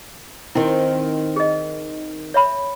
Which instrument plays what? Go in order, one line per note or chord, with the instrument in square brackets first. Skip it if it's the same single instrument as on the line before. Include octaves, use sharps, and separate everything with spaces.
[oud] D#3 C4 [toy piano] E4
[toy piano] G#4 D#5
C#5 E5 B5